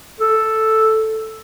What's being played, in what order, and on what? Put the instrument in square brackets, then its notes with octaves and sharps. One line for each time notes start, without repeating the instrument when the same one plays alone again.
[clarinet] A4